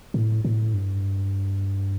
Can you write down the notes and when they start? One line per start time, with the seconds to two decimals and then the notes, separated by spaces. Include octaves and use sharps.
0.14 A2
0.45 A2
0.74 G2